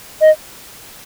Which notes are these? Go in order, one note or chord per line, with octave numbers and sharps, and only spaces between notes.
D#5